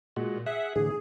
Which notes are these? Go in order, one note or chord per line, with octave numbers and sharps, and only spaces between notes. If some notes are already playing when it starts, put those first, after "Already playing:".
A#2 G#3 F#4
G#4 E5 F#5
A2 D3 E3 G#4